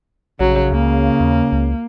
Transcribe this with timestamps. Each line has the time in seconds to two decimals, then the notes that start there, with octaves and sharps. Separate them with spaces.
0.40 A#1 C#3 F#3
0.72 C#2 A#3
1.20 D#2
1.52 C#2